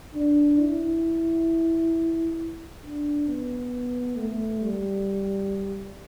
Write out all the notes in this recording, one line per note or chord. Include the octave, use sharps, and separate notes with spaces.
D4
E4
D4
B3
A3
G3